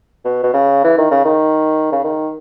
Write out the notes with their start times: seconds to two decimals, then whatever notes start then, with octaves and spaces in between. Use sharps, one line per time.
0.25 B2
0.43 B2
0.54 C#3
0.84 E3
0.98 D#3
1.11 C#3
1.25 D#3
1.92 C#3
2.04 D#3